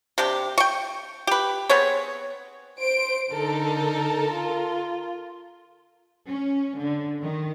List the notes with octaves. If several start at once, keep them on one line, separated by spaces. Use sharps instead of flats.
C3 D4 G4
G5 C#6
G4 B4
B3 C4 G#4 C#5
C5 D7
D3 D#4 A4 A#4
F4
C#4
D3
D#3